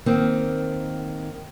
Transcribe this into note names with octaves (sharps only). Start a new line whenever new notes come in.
D#3 A#3 C4